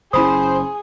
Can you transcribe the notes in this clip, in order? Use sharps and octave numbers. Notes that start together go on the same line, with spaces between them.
F#1 C#3 C#4 E4 G#4 C5 B5 D#6